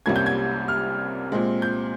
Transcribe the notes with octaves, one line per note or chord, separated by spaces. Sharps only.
C2 C3 G3 A#3 C#4 G#6
G6
G#6
F6
A#2 G#3 C4
G6